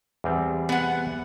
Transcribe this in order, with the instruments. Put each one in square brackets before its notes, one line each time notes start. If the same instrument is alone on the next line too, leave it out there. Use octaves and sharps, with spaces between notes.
[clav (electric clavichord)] E2 G3 C4
[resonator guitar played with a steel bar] B3 F#5